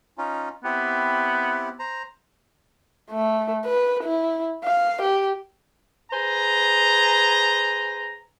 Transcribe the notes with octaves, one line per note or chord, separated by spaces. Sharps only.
C#4 D#4 F4
B3 C4 E4 G4
C5 A#5
A3
B4
E4
F5
G4
G#4 B4 C5 G#5 A#5